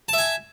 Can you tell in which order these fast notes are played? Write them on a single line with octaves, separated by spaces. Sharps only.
A5 E5 G#5